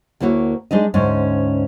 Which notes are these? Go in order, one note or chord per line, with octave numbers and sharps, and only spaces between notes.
D2 A#3 E4 F#4 C#5
G#3 D4 D#4 D#5
D2 G#2 C#4